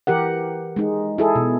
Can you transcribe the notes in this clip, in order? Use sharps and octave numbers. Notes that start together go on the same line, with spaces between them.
E3 G4 A#4 F#5
G#3 D#4
E4 G#4 A4
B2